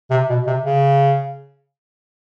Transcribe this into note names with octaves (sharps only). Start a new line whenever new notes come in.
C3
B2
C3
C#3